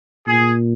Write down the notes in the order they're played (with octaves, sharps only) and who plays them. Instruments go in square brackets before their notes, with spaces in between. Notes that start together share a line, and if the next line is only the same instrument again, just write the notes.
[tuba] A#2 [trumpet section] G#4